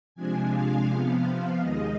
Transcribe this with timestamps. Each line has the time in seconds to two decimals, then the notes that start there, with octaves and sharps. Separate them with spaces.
0.15 C3 F3 G#3 D4 G#5
0.51 F5
0.87 C3 F3 B3
1.23 F5
1.59 D#2 D#3 G#3 D#5